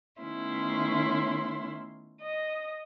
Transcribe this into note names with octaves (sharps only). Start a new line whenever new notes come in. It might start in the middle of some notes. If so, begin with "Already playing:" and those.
D#3 A3 B3 C#4 E4 C6
D#5